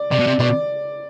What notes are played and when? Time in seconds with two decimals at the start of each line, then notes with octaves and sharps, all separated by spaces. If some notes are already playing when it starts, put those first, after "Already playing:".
Already playing: D5
0.11 C3 D5
0.19 B2
0.27 C3
0.39 B2 D5